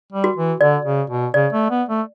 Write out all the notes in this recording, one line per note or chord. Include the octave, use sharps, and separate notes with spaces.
G3
F#4
E3
D3 D5
C#3
B2
C#3 D5
A3
B3
A3